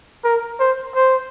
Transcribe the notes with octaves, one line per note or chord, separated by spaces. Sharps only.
A#4
C5
C5